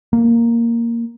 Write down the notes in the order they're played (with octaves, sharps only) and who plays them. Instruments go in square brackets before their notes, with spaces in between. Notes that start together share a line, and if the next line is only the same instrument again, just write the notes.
[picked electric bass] A#3